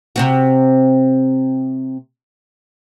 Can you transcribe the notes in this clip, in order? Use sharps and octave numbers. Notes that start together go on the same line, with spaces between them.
C3 C4 F#4